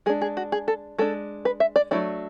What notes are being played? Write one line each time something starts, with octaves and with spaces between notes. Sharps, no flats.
G#3 D4 G#4
G#4
F#4
G#4
A4
G#3 D4 A4
B4
E5
D5
F#3 A3 D4 E4